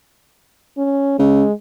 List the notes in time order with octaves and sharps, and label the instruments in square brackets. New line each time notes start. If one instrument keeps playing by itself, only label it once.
[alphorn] C#4
[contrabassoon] C#3 [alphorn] G#3